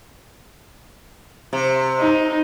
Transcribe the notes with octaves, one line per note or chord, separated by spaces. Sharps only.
C3
D#4